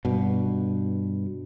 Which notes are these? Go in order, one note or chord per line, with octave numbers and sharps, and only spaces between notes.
G2 B2